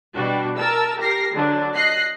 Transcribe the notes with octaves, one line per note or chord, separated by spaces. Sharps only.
B2 G3 D4 F#4
A#4 A5 E6
G4 A#4 A#6 C7
D3 F#3 D4
D#5 F#6 A#6 C7